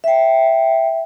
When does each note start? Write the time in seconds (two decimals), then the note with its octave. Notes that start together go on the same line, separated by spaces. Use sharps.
0.04 E5 G5